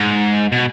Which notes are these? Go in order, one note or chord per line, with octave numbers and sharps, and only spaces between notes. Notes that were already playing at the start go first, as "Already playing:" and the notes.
Already playing: G#2
B2